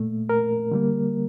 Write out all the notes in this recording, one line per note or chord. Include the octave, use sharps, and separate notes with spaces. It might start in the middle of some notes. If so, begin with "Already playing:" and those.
Already playing: A#2 A3
A#4
D3 G3 A#3